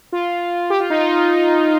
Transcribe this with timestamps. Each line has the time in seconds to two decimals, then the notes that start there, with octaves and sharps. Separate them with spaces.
0.12 F4
0.70 G4
0.80 F4
0.90 D#4
1.00 F4